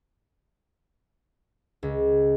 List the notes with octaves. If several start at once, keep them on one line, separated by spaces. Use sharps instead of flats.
C#2